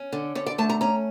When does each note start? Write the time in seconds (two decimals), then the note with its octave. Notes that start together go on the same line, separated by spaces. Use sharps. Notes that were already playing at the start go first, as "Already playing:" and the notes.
Already playing: C#4
0.13 D3
0.35 D3 C#5
0.46 D5
0.58 A3 A5
0.69 A#5
0.81 C#4 A#5